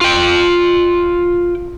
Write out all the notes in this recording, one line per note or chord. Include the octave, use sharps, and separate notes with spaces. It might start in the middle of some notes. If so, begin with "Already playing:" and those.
F4 G5